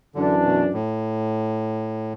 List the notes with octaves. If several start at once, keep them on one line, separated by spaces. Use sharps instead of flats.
F#2 D3 E3 D4
B2
A2